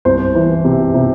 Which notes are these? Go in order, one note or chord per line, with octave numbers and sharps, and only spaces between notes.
C2 C5
E3
C3
C3